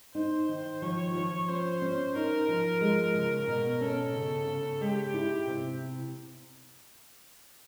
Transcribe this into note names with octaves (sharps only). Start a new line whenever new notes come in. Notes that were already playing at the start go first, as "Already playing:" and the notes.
D#4 C5
D#3
F3 C#5
F3
C#4 C5
C#4
D#4 A#4
F3
G#3
C#3
B2 A#4
C#4 A4
C#3
C#3
G#3 G4
E4
C3